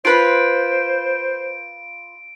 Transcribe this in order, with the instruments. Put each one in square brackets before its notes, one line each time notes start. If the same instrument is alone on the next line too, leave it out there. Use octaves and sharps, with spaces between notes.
[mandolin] F4 B4 [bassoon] C5 [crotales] D7